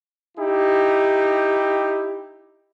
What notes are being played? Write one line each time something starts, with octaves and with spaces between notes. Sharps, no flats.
D#4 E4 G4